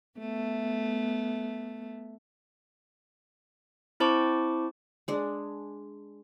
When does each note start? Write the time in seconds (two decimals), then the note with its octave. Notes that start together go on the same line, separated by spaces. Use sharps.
0.19 A3 B3
4.00 C4 E4 C5 A5 C#6 D6
5.08 G#3 D4 G#4